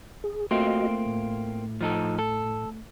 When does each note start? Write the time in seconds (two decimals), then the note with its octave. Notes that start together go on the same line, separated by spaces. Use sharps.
0.24 G#4
0.51 A3 A#3 C4 F4 F#4 D#5
1.06 A2
1.81 F3 D#4 A4
2.19 A4